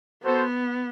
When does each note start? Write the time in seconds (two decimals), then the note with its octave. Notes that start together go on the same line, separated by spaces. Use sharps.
0.23 B3 F#4 A4 C5